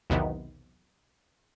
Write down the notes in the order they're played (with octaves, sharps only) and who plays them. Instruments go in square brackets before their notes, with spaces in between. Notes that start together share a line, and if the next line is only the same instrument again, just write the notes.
[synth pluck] B1 E2 C3 D#3 B3